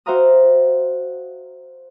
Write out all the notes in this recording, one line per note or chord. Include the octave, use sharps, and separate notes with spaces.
F#4 C5 E5 F5 A#5 D#6